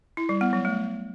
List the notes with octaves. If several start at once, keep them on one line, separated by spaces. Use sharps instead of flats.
E4
G3
B3
F#3
A3